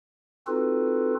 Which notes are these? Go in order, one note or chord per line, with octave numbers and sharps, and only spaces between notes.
C4 D#4 F4 F#4 A4 B4